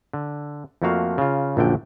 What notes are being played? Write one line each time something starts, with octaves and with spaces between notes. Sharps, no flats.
D3
F2 F3 A3 A#3 F#4 F5
C#3 F4
A#1 F#2 D3 G5